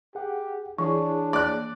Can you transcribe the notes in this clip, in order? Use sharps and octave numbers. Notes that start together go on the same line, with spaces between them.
G4 G#4 F#5
E3 D4 E4 G#4 C#5
A#3 D5 F#6